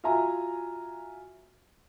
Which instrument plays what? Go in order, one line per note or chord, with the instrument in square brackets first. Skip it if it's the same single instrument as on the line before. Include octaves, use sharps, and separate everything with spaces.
[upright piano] F4 F#4 E5 G#5 A#5